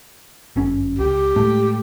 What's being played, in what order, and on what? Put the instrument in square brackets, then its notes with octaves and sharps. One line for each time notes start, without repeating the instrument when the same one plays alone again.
[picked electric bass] G1 F#2 C#4
[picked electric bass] C#2 [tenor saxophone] G4
[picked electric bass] A2 G#3 A3